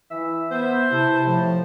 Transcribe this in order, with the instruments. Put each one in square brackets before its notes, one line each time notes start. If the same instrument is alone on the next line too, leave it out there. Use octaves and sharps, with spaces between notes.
[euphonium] E3 [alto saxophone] E5
[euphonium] B3 [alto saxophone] C5 [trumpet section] E5
[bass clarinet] C3 [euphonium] E4 [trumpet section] A5
[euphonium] A2 [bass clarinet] F3